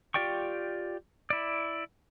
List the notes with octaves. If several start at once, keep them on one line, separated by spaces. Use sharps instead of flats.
F4 G4 D5 G5 C#6
E4 D5